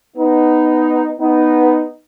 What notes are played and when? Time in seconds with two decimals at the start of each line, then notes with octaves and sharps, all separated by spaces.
0.16 B3 D#4
1.20 B3 D#4